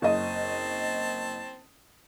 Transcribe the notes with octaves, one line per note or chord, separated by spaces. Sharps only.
F#1 C4 D#5 A5